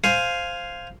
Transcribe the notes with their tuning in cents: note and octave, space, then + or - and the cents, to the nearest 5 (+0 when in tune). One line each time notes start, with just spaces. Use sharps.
C5 +0 F5 +0 G#5 +5